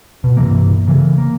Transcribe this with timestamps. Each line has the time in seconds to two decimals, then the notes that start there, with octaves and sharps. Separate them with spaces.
0.24 B2
0.37 G2 C3 E3 A#3
0.87 C#3 E3
1.18 A#3